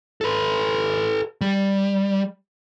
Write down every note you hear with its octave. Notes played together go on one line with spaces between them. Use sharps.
A4 B4
G3